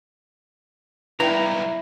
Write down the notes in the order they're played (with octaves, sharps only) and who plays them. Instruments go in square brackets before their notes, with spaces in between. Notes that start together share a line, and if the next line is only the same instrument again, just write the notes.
[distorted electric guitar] B1 G2 [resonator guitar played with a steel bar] E4 [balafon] B4 G5 [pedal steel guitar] A#5